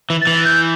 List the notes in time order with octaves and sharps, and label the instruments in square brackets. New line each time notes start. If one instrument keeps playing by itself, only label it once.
[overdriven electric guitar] E3
[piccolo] A6
[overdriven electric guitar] E3
[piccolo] G6